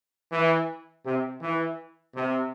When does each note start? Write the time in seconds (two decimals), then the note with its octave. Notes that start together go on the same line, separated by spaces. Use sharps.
0.32 E3
1.05 C3
1.42 E3
2.16 C3